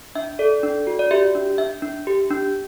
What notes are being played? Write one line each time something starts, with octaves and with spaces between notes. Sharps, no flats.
D4 E5
A4 D5
D4
F#4
D5
G4 E5
D4
D4 E5
D4
G4
D4